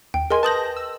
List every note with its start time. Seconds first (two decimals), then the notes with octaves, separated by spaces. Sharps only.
0.14 D#2 G5
0.30 G#4 A#4 D#5 G#5 C6
0.43 B4 A5 D#6 G6 A#6 F#7
0.77 E6